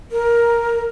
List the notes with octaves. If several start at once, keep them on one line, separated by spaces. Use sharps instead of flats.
A#4